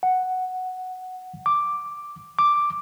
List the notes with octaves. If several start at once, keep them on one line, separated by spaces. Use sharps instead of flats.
F#5
D6
D6